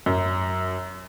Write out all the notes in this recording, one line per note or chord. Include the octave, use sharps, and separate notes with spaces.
F#2